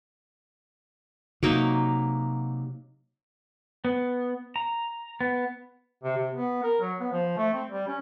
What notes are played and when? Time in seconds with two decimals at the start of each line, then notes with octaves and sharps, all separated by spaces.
1.43 C3 F#3 A#3 D#4
3.85 B3
4.56 A#5
5.21 B3
6.03 C3
6.18 C3
6.33 B3
6.63 A#4
6.81 F#3
7.00 B3
7.12 F3
7.38 A3
7.54 C4
7.70 G3
7.88 C#4